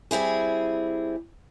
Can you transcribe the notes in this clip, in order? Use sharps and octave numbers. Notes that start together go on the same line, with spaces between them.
G3 C4 E4 G#4